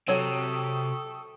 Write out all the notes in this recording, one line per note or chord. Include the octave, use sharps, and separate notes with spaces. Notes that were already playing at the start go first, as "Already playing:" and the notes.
C3 F#3 A4 C#5 G5 C#6 D#6